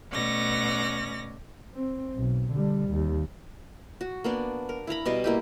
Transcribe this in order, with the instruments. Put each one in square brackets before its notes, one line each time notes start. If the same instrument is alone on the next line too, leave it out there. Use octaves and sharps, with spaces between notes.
[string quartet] B2 A3 C#4 D5 A#6
[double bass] C4
B1
D3 G3
D#2
[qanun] F#4
A#3 B3 D4
A#4
E4 F5 A#5 B5
B2 G3 D#5 F5
A#3 E4 G4